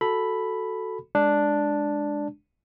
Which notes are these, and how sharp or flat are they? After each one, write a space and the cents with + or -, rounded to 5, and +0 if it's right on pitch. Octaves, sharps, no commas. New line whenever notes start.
F#4 +0 A4 +0 B5 +0
G#3 +0 D4 +0